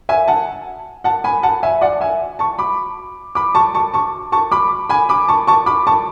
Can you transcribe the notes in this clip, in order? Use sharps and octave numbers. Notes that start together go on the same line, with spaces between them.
E5 G#5
F#5 A5
F#5 A5
G#5 B5
F#5 A5
E5 G#5
D5 F#5
E5 G#5
A5 C#6
B5 D6
B5 D6
A5 C#6
A5 C#6
A5 C#6
A5 C#6
B5 D6
G#5 B5
B5 D6
A5 C#6
A5 C#6
B5 D6
A5 C#6